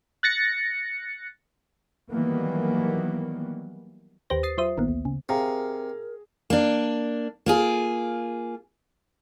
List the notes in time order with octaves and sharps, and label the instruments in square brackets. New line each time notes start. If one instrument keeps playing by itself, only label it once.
[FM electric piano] F#6 A6 A#6 C#7
[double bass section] D#3 E3 F#3 G3 A#3 B3
[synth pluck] D#2 G4 B4 C5 A#6
D#6 A6 C7
F#3 F4 C5 E5 D#6
A1 D#3 A#3 B3
D2
C#3
[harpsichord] C3 [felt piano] G#4 [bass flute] A#4 [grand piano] F5 A#5
[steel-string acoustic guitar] A#3 D4
A#3 F4 G#4